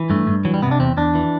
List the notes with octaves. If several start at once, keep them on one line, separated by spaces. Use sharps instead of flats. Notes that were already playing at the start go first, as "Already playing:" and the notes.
Already playing: E3
G2 A3
G2
E3 F#3
G3
C3 B3
D4
E2 C4
E2 D4
E3